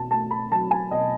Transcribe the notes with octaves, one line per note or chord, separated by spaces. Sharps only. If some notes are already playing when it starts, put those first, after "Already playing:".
Already playing: B2 A5
A3 A5
B5
F#3 A5
G#5
B2 D#5